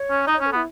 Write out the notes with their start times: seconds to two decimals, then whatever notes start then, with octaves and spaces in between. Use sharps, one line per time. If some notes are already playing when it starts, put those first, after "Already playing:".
Already playing: C#5
0.10 C#4
0.27 D#4 D#5
0.36 C#4 C#5
0.46 A4
0.52 B3 E4